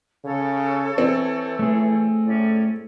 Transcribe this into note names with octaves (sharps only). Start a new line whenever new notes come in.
C#3 A4 C#5
E3 C4
A3 G#4
A2 C#4 D5